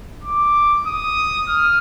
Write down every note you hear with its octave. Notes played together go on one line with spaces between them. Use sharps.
D6
D#6
F6